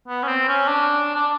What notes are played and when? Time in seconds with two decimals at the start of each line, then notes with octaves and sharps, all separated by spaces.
0.08 B3
0.23 C#4
0.28 C4
0.48 C#4
0.68 D4
1.15 D4